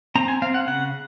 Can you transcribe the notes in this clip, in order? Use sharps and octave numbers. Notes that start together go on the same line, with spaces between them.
C4 A#5
G#5
C4 F5
F#5
C#3 F#5